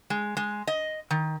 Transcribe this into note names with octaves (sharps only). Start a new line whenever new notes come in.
G#3
G#3
D#5
D#3